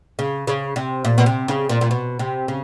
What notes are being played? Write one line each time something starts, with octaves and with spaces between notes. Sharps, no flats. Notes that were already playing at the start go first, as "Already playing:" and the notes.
C#3
C#3
C3
A#2
B2
C3
C#3
A#2
A#2
B2
C3
C#3